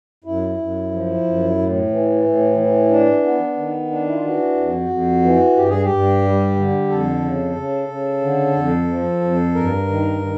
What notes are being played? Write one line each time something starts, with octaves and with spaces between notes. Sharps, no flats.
F#2 E4
F#2
F3
F#2
A2
E3
A2
E3
D4
B3
D#3
D4
E4
F4
E3 F#4
F2
F2
E3
G2 G4
G#4
G4
G2
G3
D3
F2 A4
C#3
C#3
C#3
D3
F2
F3
F2
G2 A#4
D#3
D#3